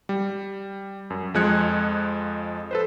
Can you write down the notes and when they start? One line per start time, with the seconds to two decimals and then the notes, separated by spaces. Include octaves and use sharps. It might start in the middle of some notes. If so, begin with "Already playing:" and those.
0.09 G3
1.10 F#2
1.34 F2 F3 G#3 F#6 G#6 C#7
2.71 A4 B4 C5